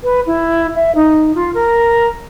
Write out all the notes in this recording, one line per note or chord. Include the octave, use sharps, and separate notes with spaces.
B4
E4
E5
D#4
F4
A#4